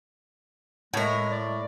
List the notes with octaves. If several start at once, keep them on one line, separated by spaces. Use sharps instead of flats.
A2 G#3 A#4
D5